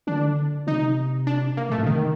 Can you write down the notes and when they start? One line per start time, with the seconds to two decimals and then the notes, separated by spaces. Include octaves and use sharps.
0.07 D3 D4
0.67 C3 D#4
1.27 D4
1.57 A#3
1.69 A2 A3
1.78 A#2
1.86 C3 D#3